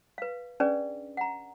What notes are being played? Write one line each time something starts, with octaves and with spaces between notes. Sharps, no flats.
B4 F5
C#4 D4 G#4 B4 D5
F#5 A#5